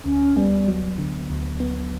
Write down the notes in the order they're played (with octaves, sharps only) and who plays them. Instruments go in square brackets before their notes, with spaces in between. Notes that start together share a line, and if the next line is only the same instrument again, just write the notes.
[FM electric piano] D2 [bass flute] C#4
[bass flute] G3 [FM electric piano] B3
[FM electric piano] F#3
D3
D2
B3